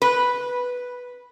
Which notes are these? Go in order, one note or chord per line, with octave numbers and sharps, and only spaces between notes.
B4